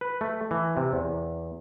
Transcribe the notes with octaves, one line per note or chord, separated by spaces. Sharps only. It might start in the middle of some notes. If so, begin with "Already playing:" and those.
B4
A3
E3
C3
E2